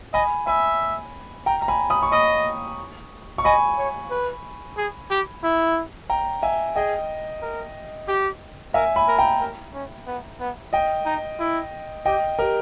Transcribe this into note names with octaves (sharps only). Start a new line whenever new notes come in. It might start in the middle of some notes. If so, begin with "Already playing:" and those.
D#5 G#5 B5
E5 G#5 B5
G5 A#5
A#5
G#5 B5
B5 D#6
C#6
D#5 B5 D#6
C#6
D#5 G#5 B5
C#5
B4
G#4
G4
E4
G5 A#5
E5 G#5
G#4 D#5 G5
A#4
G4
A#4 E5 G#5
G#5 B5
A#4
G5 A#5
A#4
C#4
B3
B3
D#5 G5
D#4
E4
G4 D#5 G5
G4 A#4